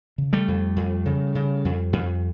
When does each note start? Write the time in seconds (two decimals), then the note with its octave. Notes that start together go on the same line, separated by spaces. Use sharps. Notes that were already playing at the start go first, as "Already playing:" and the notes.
0.18 C#3
0.33 G3 A3
0.48 F2
0.76 F2
1.05 C#3
1.35 C#3
1.65 F2
1.93 F2